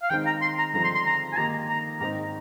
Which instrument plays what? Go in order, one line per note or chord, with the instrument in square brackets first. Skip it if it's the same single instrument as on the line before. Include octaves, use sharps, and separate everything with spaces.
[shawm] F5
[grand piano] D#3 G#3 C4 D#4 [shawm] G5
[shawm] A#5
C6
A#5
[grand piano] G2 D3 F3 G#3 C4 [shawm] A#5
[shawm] C6
C6
A#5
G#5
[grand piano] D#3 A#3 D#4 G4 [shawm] A#5
[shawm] A#5
[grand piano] G#2 D#3 G#3 C4 D#4 [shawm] A#5